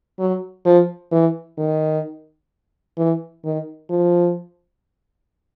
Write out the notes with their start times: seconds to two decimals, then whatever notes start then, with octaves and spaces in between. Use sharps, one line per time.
0.19 F#3
0.65 F3
1.12 E3
1.58 D#3
2.98 E3
3.45 D#3
3.90 F3